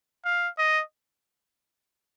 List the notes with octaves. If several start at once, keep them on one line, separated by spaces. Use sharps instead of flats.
F5
D#5